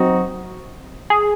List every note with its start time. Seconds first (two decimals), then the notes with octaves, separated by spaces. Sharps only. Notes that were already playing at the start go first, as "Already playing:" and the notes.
Already playing: F#3 C4 D#4 F#4
1.10 G#4